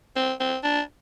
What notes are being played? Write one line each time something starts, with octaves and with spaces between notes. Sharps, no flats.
C4
C4
D4